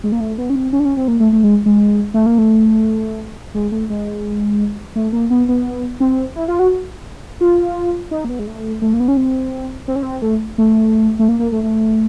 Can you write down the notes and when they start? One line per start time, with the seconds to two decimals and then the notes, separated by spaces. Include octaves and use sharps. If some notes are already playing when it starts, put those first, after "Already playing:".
0.04 G#3
0.12 A#3
0.20 A3
0.38 B3
0.50 C#4
0.56 C4
0.73 C#4
0.79 D4
0.85 C#4
0.97 C4
1.08 A#3
1.20 A3
1.32 A3
1.44 G#3
1.66 G#3
2.14 A3
2.26 A#3
2.38 A3
3.54 G#3
3.72 A3
3.90 G#3
4.96 A3
5.13 A#3
5.30 B3
5.49 B3
6.00 C4
6.36 E4
6.48 F4
6.59 F#4
7.41 F4
8.11 D#4
8.25 A#3
8.29 B3
8.39 G#3
8.47 A3
8.82 A3
8.94 A#3
9.00 B3
9.08 C#4
9.17 C4
9.88 C4
9.96 C#4
10.03 C4
10.22 A3
10.58 A3
11.19 A3
11.29 A#3
11.39 A#3
11.52 A3
11.63 A3